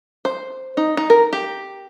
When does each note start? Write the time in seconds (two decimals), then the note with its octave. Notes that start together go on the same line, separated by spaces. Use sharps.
0.25 C5
0.77 D#4
0.97 D#4
1.10 A#4
1.33 G4